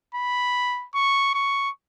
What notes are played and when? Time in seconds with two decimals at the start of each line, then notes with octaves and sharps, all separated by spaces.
0.15 B5
0.94 C#6
1.34 C#6